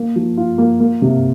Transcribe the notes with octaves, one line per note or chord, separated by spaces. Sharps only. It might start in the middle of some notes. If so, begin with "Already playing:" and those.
Already playing: A#3
F3
F4
A#3
A#3
C3